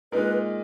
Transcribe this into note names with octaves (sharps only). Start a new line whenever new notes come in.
A#2 G#3 D#4 A#4 B4